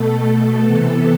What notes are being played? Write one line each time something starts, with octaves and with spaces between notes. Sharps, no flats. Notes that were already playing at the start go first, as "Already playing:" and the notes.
Already playing: B2 A3 A4
A4
C3 E3 B3